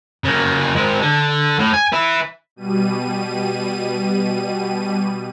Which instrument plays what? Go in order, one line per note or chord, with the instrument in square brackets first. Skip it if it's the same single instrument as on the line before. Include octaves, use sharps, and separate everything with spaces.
[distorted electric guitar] C#3 A#3
G#3 C4
D3
A2
G#5
B4 E5
[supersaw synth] B2 G3 D#7